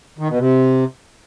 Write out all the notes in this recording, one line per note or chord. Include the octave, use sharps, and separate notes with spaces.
D#3
B2
C3